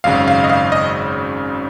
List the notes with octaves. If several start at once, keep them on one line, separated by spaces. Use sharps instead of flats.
G#1 F#2 C#3 F5
F5
D#5
F5
D#5